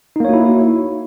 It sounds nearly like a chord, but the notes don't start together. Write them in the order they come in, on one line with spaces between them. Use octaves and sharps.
D#4 A#3 C#5 F#4 E4